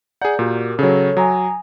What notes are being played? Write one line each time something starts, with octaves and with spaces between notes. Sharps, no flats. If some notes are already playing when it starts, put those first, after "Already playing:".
G#4 D5 F#5 A#5 G6
A#2 F#4 G4 A#4
C#3 F#3 A4 C#5
F#3 G#5 A#5 D#6